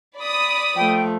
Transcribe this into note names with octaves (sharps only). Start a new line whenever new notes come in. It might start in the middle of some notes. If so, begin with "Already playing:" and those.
D5 B5 D#6
F3 A3 G5